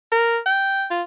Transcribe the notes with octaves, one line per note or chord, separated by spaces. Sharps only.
A#4
G5
F4